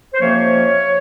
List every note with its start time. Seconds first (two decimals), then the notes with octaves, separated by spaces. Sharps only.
0.14 C5
0.20 F2 C3 F3 A#3 C#4 C#5